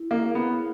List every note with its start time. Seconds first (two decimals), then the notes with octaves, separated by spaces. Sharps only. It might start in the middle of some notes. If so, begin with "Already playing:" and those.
Already playing: E4
0.11 A#3
0.22 G#4 C#5
0.35 B3